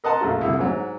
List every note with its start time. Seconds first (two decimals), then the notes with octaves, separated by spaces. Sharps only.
0.04 A#4 D#5 F#5 A5 A#5 C6
0.21 A#1 F#2 A3 F4 F#4
0.41 C2 D3 E4
0.59 G#2 F#3